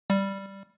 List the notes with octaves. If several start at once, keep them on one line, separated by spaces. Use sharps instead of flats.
G3